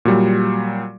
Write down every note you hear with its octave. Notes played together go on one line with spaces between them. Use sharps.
A#2 F#3 G3